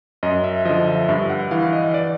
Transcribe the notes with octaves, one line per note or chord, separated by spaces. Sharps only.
F#2 D#5
E5
D3 F3 D#5
E5
G2 E5
F#5
E3 F5
D#5
D5